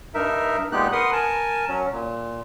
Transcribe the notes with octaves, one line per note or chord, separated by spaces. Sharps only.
G2 D#4 A#4 E5
A#2 G#3 B3 D#4 G4 F#6
A#4 B4 F#5 C6 D#6
A#4 G#5 A5
F#3 C#4
A#2